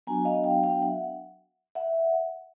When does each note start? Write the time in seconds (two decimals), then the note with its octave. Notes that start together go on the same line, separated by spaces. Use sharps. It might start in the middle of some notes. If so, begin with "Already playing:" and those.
0.07 F#3 B3 D4 F#4 G#5 A#5
0.25 D#5 F5
0.44 F5 G5
0.63 F5 G5
0.82 E5 F#5
1.75 E5 F#5